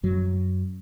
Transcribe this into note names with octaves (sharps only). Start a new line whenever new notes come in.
F#2 F#3